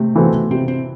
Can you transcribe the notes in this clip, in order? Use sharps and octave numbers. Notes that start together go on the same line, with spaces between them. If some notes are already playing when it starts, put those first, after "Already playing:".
Already playing: C3 A3
E3 C4 F#4 A4
C3 C4
C4